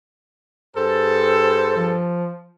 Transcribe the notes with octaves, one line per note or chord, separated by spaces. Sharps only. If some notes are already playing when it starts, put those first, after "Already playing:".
G2 G#4 A4 C5
F3